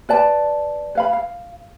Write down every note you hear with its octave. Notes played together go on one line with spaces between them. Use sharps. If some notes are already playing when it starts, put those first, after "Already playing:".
B4 D5 A5
B4 F5 B5
F5